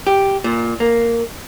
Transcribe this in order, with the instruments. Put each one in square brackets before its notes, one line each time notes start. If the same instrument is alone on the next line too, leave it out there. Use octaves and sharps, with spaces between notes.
[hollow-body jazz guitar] G4
A#2
A#3